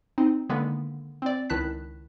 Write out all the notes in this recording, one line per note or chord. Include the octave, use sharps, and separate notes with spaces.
C4 D#4
D3 D#3 G#3 A#3 B3
C4 D5
C#2 D#3 E4 A5 F#6 B6